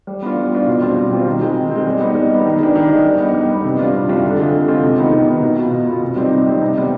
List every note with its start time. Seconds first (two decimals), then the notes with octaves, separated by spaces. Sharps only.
0.07 G3
0.22 B3 D4 F4
0.37 G3
0.51 B3 D4 F4
0.67 B2
0.81 G3 C4 F4
0.97 B2
1.12 G3 C4 F4
1.26 D#3
1.41 G#3 C4
1.56 D#3
1.71 G#3 C4
1.86 G3
2.00 B3 D#4
2.15 G3
2.31 B3 D#4
2.45 D#3
2.60 G#3 D4
2.75 D#3
2.89 G#3 D4
3.05 G3
3.20 B3 D#4
3.34 G3
3.50 B3 D#4
3.64 C3
3.79 G3 D4 F4
3.94 C3
4.09 G3 D4 F4
4.24 D3
4.38 G#3 C4 F4
4.53 D3
4.68 G#3 C4 F4
4.83 C3
4.98 D#3 B3 D#4
5.12 C3
5.27 D#3 B3 D#4
5.42 B2
5.58 B3 F4
5.71 B2
5.87 B3 F4
6.02 C3
6.16 G3 C4 D#4
6.31 C3
6.46 G3 C4 D#4
6.61 C3
6.76 G3 B3 D#4